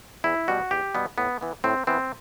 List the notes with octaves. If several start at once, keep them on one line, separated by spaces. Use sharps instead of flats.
E2 E4
B2 G3 B3 F#4
E2 G4
B2 G3 B3
A2 B3
E3 B3
A2 C4
E3 B3 C4